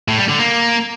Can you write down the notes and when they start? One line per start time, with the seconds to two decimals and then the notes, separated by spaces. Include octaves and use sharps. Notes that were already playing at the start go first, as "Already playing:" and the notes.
0.08 A2
0.18 G3
0.29 D3
0.39 A#3